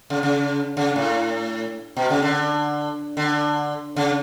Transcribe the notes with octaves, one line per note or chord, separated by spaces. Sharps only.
C#3
C#3
C#3
A2
B2
C#3
D3
D3
C#3